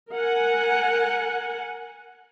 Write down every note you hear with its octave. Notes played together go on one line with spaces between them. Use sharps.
A#4 F#5 G#5